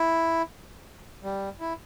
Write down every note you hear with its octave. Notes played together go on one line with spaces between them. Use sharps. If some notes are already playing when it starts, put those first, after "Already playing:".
Already playing: E4
G3
E4